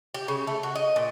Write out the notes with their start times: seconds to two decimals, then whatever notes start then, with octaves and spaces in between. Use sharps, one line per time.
0.14 G4
0.28 C#3
0.47 A3
0.63 F#4
0.76 D#5
0.96 A#2